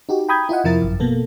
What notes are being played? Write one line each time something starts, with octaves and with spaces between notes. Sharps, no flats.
D#4 F#4 G4
G5 A#5 B5 D#6 G6 G#6
E4 F4 D#5 F#5
F2 C3 F3 E4 A#4 A6
G#1 F#2
B2 A#3 B3 A4